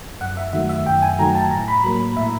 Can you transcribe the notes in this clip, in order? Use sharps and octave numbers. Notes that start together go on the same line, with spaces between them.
F#2 F#5
E5
D#3 F#3 A3 E5
E5
F#2 G5
G#5
D#3 F#3 A3 A#5
A5
A2 A#5
B5
F#3 A#3 B5
A2 E5